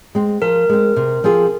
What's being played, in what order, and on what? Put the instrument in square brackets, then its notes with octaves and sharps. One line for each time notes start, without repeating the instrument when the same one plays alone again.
[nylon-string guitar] G#3 C4
[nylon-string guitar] F3 [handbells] A#4
[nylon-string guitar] G#3 C4
C3
F3 C4 F4 G#4